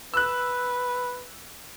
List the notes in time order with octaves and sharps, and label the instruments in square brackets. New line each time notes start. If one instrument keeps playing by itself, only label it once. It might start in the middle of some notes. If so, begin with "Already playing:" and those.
[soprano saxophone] B4 [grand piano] E6 F#6